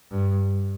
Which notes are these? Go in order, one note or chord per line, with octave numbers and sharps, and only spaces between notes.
G2